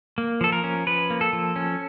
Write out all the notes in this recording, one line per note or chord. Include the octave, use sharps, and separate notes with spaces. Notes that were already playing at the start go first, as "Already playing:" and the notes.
A#3
F3 A4
A#4
C#4
F3 B4
A#3
A4
F3
C#4